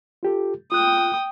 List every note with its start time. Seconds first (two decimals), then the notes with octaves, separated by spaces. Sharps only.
0.23 F4 G4 A4
0.72 F4 G5 D#6 F#6